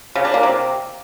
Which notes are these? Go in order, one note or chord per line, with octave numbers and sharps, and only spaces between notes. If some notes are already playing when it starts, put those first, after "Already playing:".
C#3
D4
A#3
C3